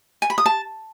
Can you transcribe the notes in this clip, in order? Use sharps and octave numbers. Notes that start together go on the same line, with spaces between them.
G#5
B5
D#6
A5